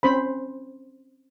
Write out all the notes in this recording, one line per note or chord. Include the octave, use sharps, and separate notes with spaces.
C4 C#4 C5 B5